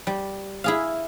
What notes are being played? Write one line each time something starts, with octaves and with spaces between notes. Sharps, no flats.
G3
E4 G#4 F5